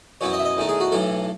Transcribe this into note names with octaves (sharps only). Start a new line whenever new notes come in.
F#2 E3 B3 E4 C#5
D#5
E5
D#5
E2 D#3 A3 D#4
G#4
F#4
B1 A2 E3 A4